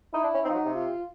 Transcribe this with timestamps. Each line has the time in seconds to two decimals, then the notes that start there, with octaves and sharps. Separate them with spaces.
0.13 D#4 E4
0.23 D4
0.34 C#4
0.44 C4 D#4
0.49 F3
0.54 F#3
0.65 C3
0.75 F4